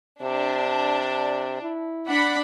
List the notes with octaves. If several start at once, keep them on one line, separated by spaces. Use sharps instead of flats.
C3 D4
E4
D4 F#5 B5